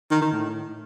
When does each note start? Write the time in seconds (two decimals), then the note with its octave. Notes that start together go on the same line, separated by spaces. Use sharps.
0.11 D#3
0.22 D#3
0.32 A2